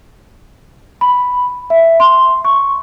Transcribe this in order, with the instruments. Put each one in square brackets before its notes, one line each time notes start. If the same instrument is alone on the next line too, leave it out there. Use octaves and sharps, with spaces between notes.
[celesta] B5
E5
C6
C#6